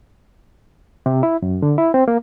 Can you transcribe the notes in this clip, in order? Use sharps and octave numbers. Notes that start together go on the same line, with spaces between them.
C3
E4
F#2
D3
E4
C4
A#3